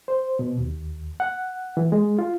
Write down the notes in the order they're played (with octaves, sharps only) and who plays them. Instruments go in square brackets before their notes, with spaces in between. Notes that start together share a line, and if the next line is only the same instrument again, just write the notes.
[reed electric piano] C5
B2
D#2
F#5
E3
G#3
F4